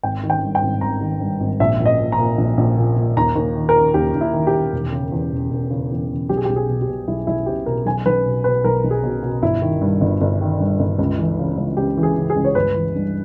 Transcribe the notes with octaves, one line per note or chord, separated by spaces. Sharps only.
G#1 G5
D#3
G5
G2
G5
G#1
G#1 A#5
D#3
G2
G#1
A#1 E5
A#1
D#5
A#2
A#5
A#2
A#1
A#1
A#2
A#2
D#2 A#5
D#2
D#3
A#4
D#3
D#2 G4
D#2
E4
D#3
G4
D#3
E1
C#3
E2
E1
E1
C#3
E2
E1
B1 G4
G#4
G4
B1
G#4
B2
G4
B2
B1 E4
B1 E4
B2 G4
B2 A#4
B1 G#5
B1 B4
B2
B2 B4
B1 A#4
B1
G#4
B2
B2
G1 E4
D#3
G2
G1
G1
D#3
G2
G1
C#2
E3
C#3
C#2
C#2 G4
E3
G#4
C#3
G#4
C#2
C#5
G1 B4
E3
G2